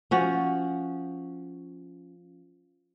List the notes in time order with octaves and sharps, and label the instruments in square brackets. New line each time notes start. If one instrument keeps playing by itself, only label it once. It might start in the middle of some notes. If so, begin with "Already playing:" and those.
[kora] F3 C#4 F#4